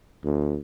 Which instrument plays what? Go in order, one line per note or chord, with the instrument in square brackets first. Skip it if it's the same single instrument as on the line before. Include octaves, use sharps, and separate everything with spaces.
[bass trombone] D2